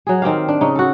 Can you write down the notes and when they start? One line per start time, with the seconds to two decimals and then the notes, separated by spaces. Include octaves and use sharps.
0.07 F#3 G#4
0.22 D#3 C4 G4 F5
0.48 D4
0.61 C#3 D#4
0.75 F#4 A4